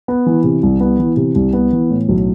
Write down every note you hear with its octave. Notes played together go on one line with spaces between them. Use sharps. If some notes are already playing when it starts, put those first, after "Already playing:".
B3
E3
C3
C2
B3
E3
C3
C2
B3
E3
A2
B1